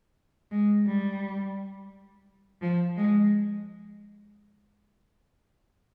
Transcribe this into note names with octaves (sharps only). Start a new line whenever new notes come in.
G#3
G3
F3
G#3